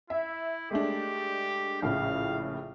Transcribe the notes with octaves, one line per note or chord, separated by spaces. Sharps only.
E4 E5
G#3 A3 D4 G4
A#1 A2 C#3 F5